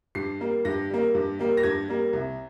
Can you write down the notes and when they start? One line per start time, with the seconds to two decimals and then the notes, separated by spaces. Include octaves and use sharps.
0.15 G2 C7
0.40 G3 A#3
0.65 G2 A#6
0.90 G3 A#3
1.15 G2
1.39 G3 A#3
1.57 A#6
1.63 G2 G#6
1.88 G3 A#3
2.13 C2